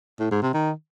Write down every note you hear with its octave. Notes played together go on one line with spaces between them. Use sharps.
A2
G#2
C3
D#3